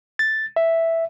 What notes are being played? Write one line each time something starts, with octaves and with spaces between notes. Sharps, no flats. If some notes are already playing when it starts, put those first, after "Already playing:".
A6
E5